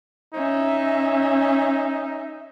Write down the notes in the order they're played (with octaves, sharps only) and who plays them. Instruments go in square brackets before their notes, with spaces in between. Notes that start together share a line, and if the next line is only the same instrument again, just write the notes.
[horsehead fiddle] C#4 E5 [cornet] D#4